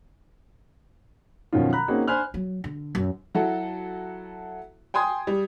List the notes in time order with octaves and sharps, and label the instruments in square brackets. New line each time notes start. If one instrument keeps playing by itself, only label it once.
[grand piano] F#2 B2 D#3 F3 C#4 F4
A#5 B5 F#6
A#3 C4 C#4 D#4 F#4 G#4
D4 C5 G#5 B5 F6 F#6
[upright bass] F#3
D3
F#2
[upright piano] F#3 E4 F#4 A4
G5 G#5 C6 D#6 G#6
G3